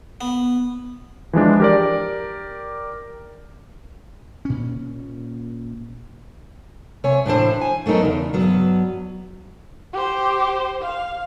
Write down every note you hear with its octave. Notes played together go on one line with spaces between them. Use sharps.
B3
E3 F3 G#3 D4
G4 A#4 D5
A#2 C#4
C3 C#5 G#5
A2 E3 D4 C5
G#5
F#3 A3 B3 D#4 A#4
E2 C#3
G2 F#3 B3
G4 C5
F5